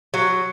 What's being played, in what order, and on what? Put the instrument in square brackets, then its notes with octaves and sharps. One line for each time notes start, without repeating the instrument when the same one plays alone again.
[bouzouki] F#3